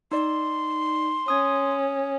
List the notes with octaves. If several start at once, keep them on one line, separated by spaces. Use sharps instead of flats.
D#4 D5 C6
C#4 D#6 G#6